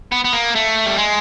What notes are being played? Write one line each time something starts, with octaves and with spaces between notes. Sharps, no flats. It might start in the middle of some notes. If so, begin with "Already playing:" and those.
B3
B3
A#3
A3
G3
G#3